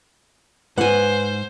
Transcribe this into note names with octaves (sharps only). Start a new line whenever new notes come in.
G#2 B4 C5 F#5 G#5